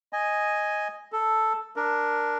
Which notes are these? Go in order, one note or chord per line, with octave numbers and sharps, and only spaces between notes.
D#5 G#5
A4
D4 A#4